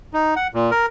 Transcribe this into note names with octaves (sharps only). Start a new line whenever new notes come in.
D#4
F#5
A#2
A#4